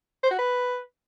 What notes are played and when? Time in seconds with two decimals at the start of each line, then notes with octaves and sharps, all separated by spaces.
0.23 C5
0.31 F#4
0.39 B4